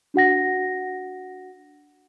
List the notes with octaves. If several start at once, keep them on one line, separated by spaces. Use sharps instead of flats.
D4 F#4 F#5 A#6